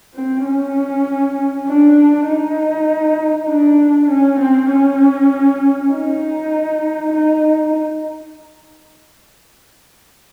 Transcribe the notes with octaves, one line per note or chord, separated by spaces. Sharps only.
C4
C#4
D4
D#4
D4
C#4
C4
C#4
D#4
D#4